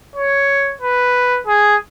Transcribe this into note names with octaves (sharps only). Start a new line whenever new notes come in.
C#5
B4
G#4